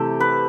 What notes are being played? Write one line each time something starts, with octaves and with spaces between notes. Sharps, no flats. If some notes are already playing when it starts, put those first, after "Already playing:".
Already playing: C3 E3 A3 G4 A4
B4